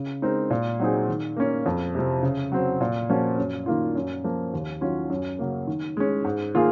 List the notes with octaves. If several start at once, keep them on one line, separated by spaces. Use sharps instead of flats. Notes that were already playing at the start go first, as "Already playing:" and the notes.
Already playing: C#3
G#3 C4 D#4 A#4
A#2
F#3 C4 D#4 G#4
D#3
A#3 C#4
F2
C3 F3
C#3
F#3 C4
A#2
F3 A#3 C#4 F#4
F#2
D#3 A#3 F4
F#2
F3 A#3
D#2
D#3 F#3 C#4 F4
F#2
C#3 F#3 A#3
D#3
G#3 C#4
G#2
D#3 A#3 F4 G#4